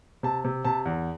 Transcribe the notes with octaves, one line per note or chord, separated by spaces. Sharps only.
C3 A5
C3
C3 A5
E2